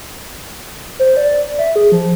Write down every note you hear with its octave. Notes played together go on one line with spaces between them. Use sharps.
C5
D5
D5
E5
G#4
F3